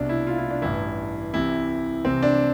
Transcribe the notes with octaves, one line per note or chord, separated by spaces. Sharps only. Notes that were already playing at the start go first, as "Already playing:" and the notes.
Already playing: C2 B2 D4
E4
F4
E4
D4
A1 G2 E3 E4
C2 C3 E3 E4
C2 C3 E3 C4
D4